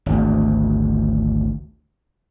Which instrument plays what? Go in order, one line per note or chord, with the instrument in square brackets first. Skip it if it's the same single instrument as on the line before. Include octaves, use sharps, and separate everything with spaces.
[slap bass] G#1 D2